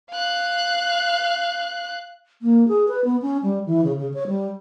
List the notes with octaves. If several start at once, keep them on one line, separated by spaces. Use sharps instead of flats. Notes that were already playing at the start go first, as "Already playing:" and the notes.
F5 F#6
A#3
G#4
B4
B3
C#4
G3
E3
C#3
C#3
C#5
G3